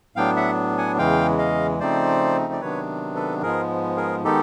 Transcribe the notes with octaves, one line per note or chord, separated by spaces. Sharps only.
A2 F#3 B3 D4 F5 G5
E5 F#5
F#5 G#5
E2 C#3 E3 G#3 F5 G5
D#5 F5
C#3 F3 A3 C4 D#4 C5 D5
D5
C3 D#3 F#3 B3 D4 B4 C#5
A4 B4
G#2 F3 G#3 B3 G#4 A#4
G#4 A#4
D#3 G#3 B3 D#4 G4 A4